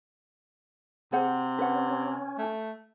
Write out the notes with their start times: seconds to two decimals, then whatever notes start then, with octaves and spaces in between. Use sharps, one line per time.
1.12 C3 G#4 C5 F#5
1.59 C#4 B4 F#5
2.38 A3